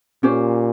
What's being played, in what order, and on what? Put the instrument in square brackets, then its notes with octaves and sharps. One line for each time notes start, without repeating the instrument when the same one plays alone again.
[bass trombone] A#2 [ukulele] C#4 G4 C5